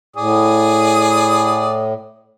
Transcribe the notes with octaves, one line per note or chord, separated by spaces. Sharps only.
A2 G#4 D5 D#6